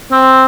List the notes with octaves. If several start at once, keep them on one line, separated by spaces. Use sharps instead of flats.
C4